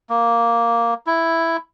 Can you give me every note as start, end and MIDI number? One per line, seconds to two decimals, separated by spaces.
0.10 0.94 58
1.07 1.57 64